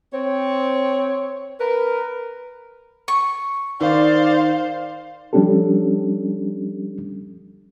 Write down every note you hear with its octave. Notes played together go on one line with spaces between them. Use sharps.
C4 C#5
A#4 B4
C#6
D#3 C5 D5 F5
F3 G3 C#4 D4 G4 A4